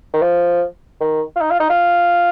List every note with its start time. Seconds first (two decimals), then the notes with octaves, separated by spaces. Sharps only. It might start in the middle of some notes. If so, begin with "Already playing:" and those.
0.14 D#3
0.22 F3
1.00 D#3
1.36 F4
1.41 D#4
1.51 F4
1.60 D#4
1.70 F4